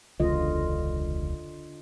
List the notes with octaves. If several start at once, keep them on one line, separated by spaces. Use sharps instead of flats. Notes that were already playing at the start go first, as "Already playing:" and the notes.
E1 C#2 D3 F4 D#5